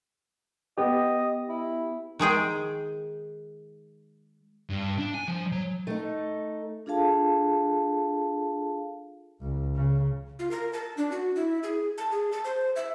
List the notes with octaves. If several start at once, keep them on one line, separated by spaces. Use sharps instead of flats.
B3 G4 D#5
E4
D#3 G#3 G#4 G5
G2
D4
G#5
F3
F#3
A3 D#4
D4 F4 G#4 A4 F5 A5
C#2
C#3
F4
A#4
A5
D4
F#4
E4
G#4
A5
G#4
A5
C5
E5